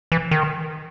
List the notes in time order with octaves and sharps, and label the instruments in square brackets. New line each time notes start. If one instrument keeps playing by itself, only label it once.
[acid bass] E3
D#3